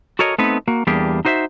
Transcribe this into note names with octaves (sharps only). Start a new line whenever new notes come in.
F#4 A4 A#4 C#5 D#5
A3 B3 C4 D#4 B4
A#3 F#4
E2 G3 A#3 D4 G4 G#4
D#4 F#4 C5 D#5 E5